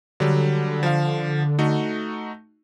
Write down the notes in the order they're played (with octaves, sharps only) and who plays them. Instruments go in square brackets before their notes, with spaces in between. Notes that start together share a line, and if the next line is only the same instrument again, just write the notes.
[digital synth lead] D3 [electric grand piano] F#3 G3
[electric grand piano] F3 F5
A3 D#4 F#4